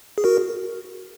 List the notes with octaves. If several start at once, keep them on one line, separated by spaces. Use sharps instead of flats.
G#4
F#4 A#4